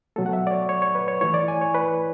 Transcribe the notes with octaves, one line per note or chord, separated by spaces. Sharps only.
B2 F#3 A3 A4
F#5
E5
D5
C#5
C#5
C#5
B4
C#5
E3 A3 E4 C#5
D5
G#5
C#5
B4